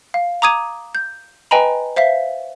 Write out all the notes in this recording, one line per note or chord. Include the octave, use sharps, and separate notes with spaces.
F5
A#5 D6 D#6 G#6 D#7
G6
B4 D#5 G5 G#5 A#5 B5
C5 E5 F5 B6